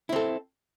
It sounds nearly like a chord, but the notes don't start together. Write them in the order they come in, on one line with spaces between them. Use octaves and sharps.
E4 C4 A4